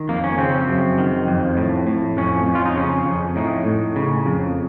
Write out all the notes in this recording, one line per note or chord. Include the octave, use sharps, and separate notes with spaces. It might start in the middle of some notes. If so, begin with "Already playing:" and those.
Already playing: D#3
F2 A#3
C#4
C#3 C4
F#2
D#3
F2
A2
A2
F2 C#4
F2
F4
D#4
C#3 C#4
F2
A2 D#4
A2
C#3
F2